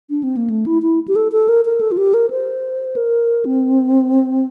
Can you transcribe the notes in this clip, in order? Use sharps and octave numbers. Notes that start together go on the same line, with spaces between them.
D4
C4
A#3
A3
E4
E4
G4
A4
A4
A#4
A#4
A4
F4
G4
A#4
C5
A#4
C4